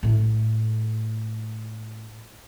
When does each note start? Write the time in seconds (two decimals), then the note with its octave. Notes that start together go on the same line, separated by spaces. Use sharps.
0.03 A2 A3